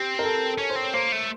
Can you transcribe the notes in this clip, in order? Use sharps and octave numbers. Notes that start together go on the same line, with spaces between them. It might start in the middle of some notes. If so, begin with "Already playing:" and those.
Already playing: C4 G4
A#4
A4
C#4 C#5
C5
C4
C#5
A#3 C5
A3